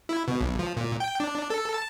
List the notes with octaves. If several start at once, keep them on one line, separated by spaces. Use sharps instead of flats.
E4
B2
B1
F3
A#2
G5
D4
A4
A5